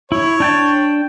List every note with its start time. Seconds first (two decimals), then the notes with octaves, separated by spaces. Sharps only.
0.12 E4 C#5
0.40 D4 G5 A5